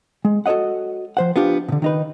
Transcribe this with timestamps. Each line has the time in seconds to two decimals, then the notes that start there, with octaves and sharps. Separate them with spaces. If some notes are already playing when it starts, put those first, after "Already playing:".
0.25 G#3
0.46 F#4 A4 C#5 D#5 F#5
1.17 F3 C5 F#5
1.36 B3 D4 F4 G4
1.68 B2 D3
1.82 D#3 D#4 B4